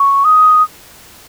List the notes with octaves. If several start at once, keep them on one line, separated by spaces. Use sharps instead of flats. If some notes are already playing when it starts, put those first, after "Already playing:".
Already playing: C#6
D#6